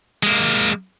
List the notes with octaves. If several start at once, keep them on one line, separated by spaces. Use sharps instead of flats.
G#3 A#3